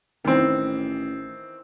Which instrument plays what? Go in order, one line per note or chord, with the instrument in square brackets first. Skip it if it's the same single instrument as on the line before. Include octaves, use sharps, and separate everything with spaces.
[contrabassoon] A1 [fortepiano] D#3 E3 C4